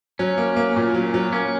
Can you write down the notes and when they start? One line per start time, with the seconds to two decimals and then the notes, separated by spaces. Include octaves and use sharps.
0.19 F#3 C#4
0.38 A#3
0.56 A#3
0.76 A#2
0.95 F#3
1.14 F#3
1.33 A#3 C#4